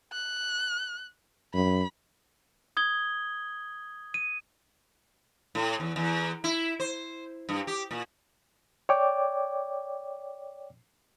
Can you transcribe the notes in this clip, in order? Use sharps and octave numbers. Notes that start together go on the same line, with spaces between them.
F#6
F#2 B5
D#6 G#6 G7
D#7
A2
E2
E2
E4
C5
G2
G4
A#2
C#5 D5 G5 D6